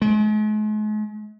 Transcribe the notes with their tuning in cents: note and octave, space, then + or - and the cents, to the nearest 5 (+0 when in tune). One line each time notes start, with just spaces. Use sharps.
G#3 +45